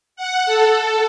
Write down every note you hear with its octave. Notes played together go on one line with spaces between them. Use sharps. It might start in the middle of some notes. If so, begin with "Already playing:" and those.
F#5
A4